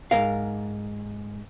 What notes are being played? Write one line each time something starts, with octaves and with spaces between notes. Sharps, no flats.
G#2 A#4 F5